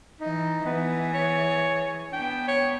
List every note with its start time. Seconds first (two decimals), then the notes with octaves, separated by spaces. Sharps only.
0.21 E3 D#4
0.66 E3 B3 G#4
1.14 C#5
2.13 B3 D4 G5
2.48 C#5